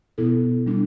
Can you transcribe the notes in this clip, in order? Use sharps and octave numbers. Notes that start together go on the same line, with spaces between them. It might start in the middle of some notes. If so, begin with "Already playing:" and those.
B2 B3 E4 A4
G3 D4